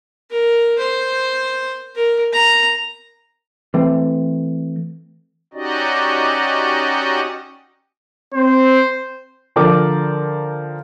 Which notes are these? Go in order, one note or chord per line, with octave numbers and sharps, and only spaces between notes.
A#4
C5
A#4
A#5
E3 A3 C4
C#4 D#4 F#4 G4 D5 D#5
C4 C5
D3 F3 A#4 D5 G5 D6